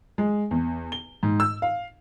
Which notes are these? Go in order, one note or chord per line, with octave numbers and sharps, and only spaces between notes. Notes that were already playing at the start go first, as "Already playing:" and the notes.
G#3
E2
G7
G#2
E6
F5